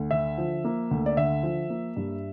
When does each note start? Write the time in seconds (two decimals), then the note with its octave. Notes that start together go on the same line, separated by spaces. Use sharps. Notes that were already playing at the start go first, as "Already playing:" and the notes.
Already playing: D2
0.11 D3 E5
0.38 F3
0.64 A#3
0.91 D2
1.06 D5
1.17 D3 E5
1.43 F3
1.70 A#3
1.96 G2